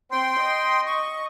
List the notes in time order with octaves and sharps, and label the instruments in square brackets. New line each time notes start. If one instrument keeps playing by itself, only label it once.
[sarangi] C4 [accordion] G5 C6
[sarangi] D#5
[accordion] C#6